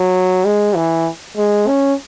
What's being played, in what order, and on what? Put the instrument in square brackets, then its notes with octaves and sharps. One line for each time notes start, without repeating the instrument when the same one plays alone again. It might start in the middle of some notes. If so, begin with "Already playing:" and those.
Already playing: [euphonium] F#3
G#3
E3
G#3
C#4